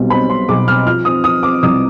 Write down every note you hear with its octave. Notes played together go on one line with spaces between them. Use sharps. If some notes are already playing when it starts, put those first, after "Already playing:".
Already playing: B1 B2 G3 C4
C4 B5
C4 C6
B1 D6
C4 F6
F3 F6
C4 D#6
F3 D#6
C4 D6
C2 D#6